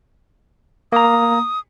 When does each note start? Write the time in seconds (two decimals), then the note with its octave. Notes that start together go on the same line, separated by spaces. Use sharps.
0.92 A#3 A#5 D#6